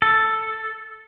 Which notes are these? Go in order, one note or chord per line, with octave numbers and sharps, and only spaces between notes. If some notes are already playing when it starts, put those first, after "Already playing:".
A4